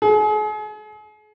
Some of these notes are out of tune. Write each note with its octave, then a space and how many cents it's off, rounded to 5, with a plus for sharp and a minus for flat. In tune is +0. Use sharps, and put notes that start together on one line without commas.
G#4 +40